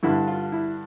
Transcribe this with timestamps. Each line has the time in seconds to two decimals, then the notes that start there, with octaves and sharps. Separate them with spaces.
0.03 G2 D3 E4
0.27 F4
0.52 E4